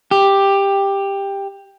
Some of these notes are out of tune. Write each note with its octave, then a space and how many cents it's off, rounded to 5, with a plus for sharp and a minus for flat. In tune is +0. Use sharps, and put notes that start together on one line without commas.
G4 +10